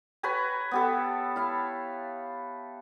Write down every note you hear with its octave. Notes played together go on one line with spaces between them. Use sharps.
B4 C#5 G#5 A#5
B3 G4 A4
E4 F5